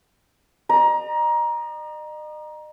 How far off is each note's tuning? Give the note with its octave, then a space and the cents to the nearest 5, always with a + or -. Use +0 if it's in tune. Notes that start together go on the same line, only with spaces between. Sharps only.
D#5 -40 A#5 +20